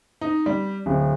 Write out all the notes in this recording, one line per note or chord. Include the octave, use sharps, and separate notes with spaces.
D#4
G3
D1